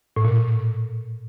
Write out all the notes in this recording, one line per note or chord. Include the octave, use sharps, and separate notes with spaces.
A2
A#2